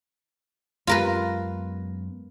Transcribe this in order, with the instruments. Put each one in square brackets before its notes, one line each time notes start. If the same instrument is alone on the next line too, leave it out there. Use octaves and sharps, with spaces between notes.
[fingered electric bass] F#2 G#3 B3 [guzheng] F4 A#4 B4